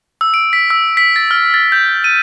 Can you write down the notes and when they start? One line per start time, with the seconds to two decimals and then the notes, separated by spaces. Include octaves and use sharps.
0.21 E6
0.34 D7
0.53 B6
0.70 E6
0.97 B6
1.16 A6
1.31 F6
1.54 A6
1.72 G6
2.04 D#7